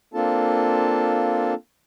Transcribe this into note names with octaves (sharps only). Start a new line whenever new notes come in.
A#3 C4 D4 F4 A4 A5